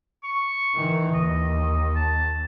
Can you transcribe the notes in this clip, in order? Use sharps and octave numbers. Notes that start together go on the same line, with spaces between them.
C#6
D#3 E3
D#2 D#5
A5